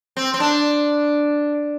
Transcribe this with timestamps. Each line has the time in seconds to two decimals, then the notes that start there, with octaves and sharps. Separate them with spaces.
0.17 C4
0.34 C4
0.40 D4